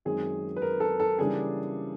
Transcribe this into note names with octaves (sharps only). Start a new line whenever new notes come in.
F#2 D#3 G#3 C4 G#4
B4
A#4
A4
A4
C#3 E3 G3 A#3 D4 G#4